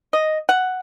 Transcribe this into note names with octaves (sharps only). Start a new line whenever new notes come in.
D#5
F#5